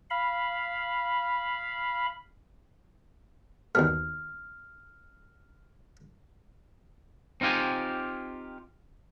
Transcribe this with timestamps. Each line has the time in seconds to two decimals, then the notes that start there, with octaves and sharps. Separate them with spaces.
0.10 F5 B5
3.75 D#2 B2 A3 F6
7.41 C4 D#4 F4 G4 G#5